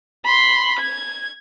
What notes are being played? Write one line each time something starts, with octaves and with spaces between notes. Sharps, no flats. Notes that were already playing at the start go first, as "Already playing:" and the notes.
B5 C6
G#6